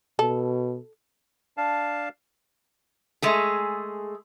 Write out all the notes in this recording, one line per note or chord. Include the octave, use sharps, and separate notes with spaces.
B2 A4
D4 F5 A5
G#3 A3 G#4